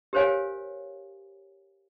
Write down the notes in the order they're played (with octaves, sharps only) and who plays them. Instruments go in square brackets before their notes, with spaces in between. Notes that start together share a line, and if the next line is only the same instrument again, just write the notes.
[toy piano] G4 A#4 C5 C#5 F5 G#5